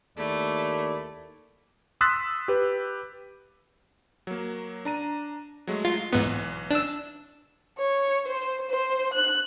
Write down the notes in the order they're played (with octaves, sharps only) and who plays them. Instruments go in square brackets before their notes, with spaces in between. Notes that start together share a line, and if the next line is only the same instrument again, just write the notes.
[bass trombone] D#2 [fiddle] A3 [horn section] E4 A#4 D5
[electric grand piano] C6 D#6 E6 F#6 A6 B6
G4 B4
F#3 A#3
D4 A#5 D#7
F#3 G#3 A3
[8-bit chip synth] F4
[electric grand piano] B1 E3 [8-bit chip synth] G#2 B3
[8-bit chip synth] D4 E6
[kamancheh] C#5
C5
C5
F#6